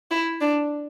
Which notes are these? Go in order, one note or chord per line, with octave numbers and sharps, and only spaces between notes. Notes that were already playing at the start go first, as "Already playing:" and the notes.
E4
D4